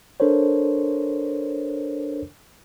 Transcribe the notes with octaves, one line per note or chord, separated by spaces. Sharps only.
D4 A4 A#4 C5 C#5